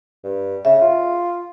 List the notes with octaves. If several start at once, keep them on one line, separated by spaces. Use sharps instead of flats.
G2
C#3 E5
F4